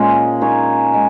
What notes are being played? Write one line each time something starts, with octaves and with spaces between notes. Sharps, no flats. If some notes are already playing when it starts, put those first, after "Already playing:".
Already playing: A#2 G#3 C#4
A#3 D#4 G#4 C#5
G#3